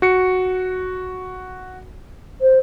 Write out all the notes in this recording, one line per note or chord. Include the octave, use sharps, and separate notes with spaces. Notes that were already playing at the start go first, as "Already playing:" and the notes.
F#4 C#7
C5